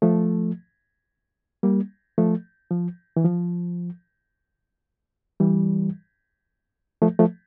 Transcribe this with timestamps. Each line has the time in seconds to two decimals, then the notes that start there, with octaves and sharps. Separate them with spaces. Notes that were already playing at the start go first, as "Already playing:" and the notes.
0.02 F3 A3
1.63 G3 A#3
2.18 F3 A3
2.71 F3
3.17 E3
3.24 F3
5.40 E3 G3
7.02 F3 A3
7.19 F3 A3